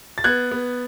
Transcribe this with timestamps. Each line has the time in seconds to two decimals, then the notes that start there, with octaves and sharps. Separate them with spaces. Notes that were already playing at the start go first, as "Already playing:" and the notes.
0.18 A6
0.24 B3 F#6 G#6
0.52 B3